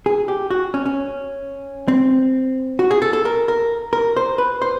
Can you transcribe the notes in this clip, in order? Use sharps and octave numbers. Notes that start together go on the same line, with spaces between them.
G#4
G4
F#4
C#4
C#4
C4
F#4
G#4
A4
A4
A#4
A#4
A#4
C5
B4
C5